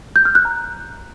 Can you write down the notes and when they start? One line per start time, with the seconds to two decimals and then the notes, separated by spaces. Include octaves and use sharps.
0.16 G6
0.25 F6
0.35 F#6
0.45 A#5